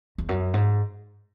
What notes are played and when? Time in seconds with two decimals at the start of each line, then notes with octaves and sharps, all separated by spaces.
0.18 E2
0.29 F#2
0.54 G#2